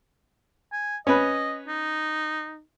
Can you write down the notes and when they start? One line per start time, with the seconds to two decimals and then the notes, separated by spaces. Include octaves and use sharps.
0.72 G#5
1.07 C#4 B4 D#5
1.68 D#4